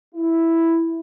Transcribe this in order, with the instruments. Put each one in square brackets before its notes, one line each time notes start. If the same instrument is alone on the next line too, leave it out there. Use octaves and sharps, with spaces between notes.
[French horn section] E4